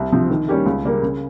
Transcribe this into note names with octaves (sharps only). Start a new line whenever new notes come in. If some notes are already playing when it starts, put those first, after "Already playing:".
Already playing: C2
C3 F3 C4
D#3
G3 C#4 G4 A#4
C#2
C#3 G3 A#3
C#3